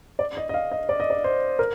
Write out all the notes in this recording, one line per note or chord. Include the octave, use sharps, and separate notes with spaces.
D5
D#5
D#5
F5
D#5
D5
D#5
D5
C5
A#4